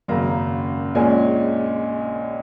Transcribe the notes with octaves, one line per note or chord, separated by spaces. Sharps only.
G#1 F#2 C#3 A#3 A#5
A#1 A#2 G#3 C#4 G#5